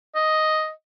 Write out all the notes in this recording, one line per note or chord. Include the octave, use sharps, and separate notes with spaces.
D#5